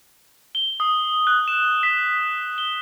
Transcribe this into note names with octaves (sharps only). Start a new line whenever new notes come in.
G7
D#6
F#6
E7
B6
G7